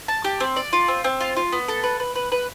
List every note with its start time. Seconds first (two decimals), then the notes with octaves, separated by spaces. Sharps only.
0.08 A5
0.24 G4
0.40 C4
0.56 D5
0.73 F4
0.88 C4
1.04 C4
1.20 F4
1.37 F4
1.52 B3
1.68 A4
1.84 B4
2.00 B4
2.15 B4
2.32 B4